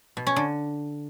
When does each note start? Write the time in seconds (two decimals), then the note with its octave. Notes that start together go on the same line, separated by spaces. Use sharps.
0.17 B2
0.27 C#4
0.36 D3